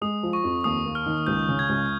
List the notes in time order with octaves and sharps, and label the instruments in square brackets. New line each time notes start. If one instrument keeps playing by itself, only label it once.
[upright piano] G#3 [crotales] D#6
[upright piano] F3
[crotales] C#6
[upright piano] F2
[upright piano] D#2 [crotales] D#6
[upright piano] A#3
[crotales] F6
[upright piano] D#3
[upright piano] C#2 [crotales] G6
[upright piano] C#3
[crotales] G#6
[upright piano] C#2